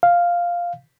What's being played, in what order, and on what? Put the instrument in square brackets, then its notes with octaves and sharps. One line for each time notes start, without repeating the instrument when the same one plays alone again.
[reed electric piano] F5